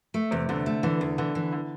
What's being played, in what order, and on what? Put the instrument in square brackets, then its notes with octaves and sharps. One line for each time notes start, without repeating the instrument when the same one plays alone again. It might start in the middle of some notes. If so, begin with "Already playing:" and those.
[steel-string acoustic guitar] A3
[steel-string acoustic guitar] E2 [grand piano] C3
[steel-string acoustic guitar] E2 [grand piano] D3
[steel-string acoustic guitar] A3
[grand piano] D3 [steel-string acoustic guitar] E3
[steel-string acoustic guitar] E2
[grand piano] D3 [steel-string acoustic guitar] E3
[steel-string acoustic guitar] E3
[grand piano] D3